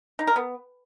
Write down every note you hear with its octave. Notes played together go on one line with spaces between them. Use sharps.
D#4
A#4
B3